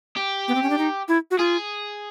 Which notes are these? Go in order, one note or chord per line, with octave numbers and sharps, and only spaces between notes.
G4
B3
C4
C#4
D4
D#4
E4
F#4
F4 G#4